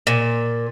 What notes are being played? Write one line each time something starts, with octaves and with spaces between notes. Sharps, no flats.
A#2